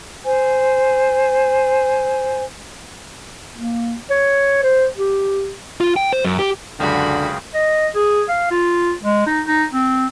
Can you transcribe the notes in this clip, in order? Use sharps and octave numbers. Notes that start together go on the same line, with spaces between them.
C5 G#5
A#3
C#5
C5
G4
F4
G5
C5
F#2
G4
C#2 F#2 D3 F#4 G#4 F5 G5 B5
D#5
G#4
F5
F4
G#3
D#4
D#4
C4